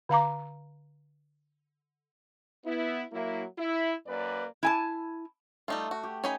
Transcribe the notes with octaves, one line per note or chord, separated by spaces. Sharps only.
D3 F5 A#5 D6
B3 E4
F#3 A#3 E4
E4
F#2 A#3 B4 D5
E4 G#5 A5
G3 A3 D#4 F4
F#4
G4
C#4 D#4 G#5 B5